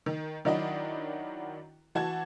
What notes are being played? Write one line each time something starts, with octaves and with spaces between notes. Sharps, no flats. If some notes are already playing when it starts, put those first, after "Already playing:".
D#3
D#3 F#3 D4 E4 F#4 D#5
E3 F#4 A5 G#6